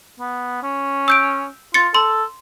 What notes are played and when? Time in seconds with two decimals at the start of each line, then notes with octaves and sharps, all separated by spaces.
0.20 B3
0.63 C#4
1.08 E6 G6 D7
1.74 F4 A6 C#7
1.95 A4 C6